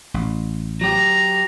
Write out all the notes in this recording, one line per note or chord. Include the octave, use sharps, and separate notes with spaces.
A1
F#3 G4 A#5